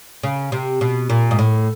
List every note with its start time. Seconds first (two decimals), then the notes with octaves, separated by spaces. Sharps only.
0.23 C#3
0.52 C3
0.81 B2
1.10 A#2
1.31 G#2
1.39 A2